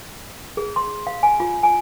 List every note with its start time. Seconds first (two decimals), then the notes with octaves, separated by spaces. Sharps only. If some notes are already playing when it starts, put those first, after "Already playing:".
0.57 G#4
0.76 C6
1.07 F5
1.23 G#5
1.40 F4
1.63 G#5